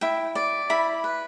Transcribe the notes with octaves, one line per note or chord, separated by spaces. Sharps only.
E4 G5
D5
E4 B5
B4